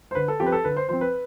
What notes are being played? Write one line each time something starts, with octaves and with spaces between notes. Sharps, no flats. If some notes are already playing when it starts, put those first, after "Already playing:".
C5
D3 B4
A4
F3 C4 G4
B4
A4
D3 B4
C5
F3 C4 C5
B4